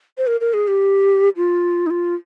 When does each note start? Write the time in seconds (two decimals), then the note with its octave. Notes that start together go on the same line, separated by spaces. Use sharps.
0.18 C5
0.27 A#4
0.41 A#4
0.54 G#4
0.68 G4
1.37 F4
1.86 D#4
1.90 F4